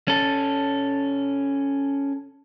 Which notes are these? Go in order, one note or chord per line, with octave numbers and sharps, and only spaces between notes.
C#4 A4